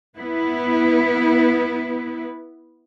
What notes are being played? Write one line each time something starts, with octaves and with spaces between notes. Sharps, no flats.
B3 E4 B4